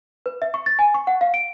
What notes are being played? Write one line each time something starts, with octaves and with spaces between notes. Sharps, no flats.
B4
E5
C#6
A6
G#5
C#6
F#5
F5
D7